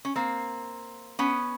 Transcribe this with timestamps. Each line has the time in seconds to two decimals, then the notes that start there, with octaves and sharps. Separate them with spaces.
0.05 C#4
0.16 A#3 C4
1.19 B3 C#4